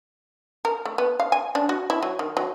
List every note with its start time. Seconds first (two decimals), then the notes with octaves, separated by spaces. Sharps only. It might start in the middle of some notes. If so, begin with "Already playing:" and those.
0.65 A#4
0.86 A3
0.98 B3
1.20 F5
1.32 G#5
1.55 D4
1.69 F#4
1.90 E4
2.03 F#3
2.19 D#3
2.37 F#3